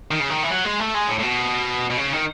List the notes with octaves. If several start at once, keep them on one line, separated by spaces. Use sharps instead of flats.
D#3
C#3
D#3
E3
F#3
G#3
A3
G#3
A2
A2
B2
B2
C#3
D#3